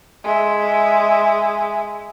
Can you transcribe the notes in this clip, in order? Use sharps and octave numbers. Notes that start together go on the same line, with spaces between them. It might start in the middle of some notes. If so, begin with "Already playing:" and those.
G#3 E5